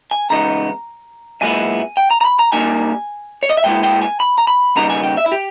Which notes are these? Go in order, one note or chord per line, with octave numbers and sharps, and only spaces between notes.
G#5
E2 C#3 G#3 B3 D#4 A#5
B1 A#2 G#3 B3 E4 G#5
G5
A#5
A#5
B5
A#5
A#2 G3 A#3 D#4 G#5
C#5
D#5
E5
A#2 G#3 B3 E4 G5
G5
G#5
B5
A#5
B5
D#2 C#3 G3 B3 D#4 A#5
G#5
G5
E5
E4
G4